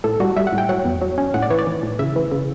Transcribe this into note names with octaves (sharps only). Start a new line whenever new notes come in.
A2 A4
G3 F#4
G3 E5
F#5
A2
G5
F#3 F#5
E2
F#3
C#4
A2 F#5
D5
E3 C#5
D5
E3
A2
C#3 E5
E3
C#3